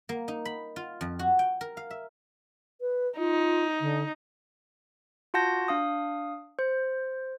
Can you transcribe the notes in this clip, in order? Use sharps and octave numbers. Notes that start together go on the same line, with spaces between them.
A#3
D#4
B5
F4
F2
F#4
G5
A#4
F5
E5
B4
D#4 F4
D3
F4 F#4 F#5 A5 G6 A#6
D4 F5 D#6
C5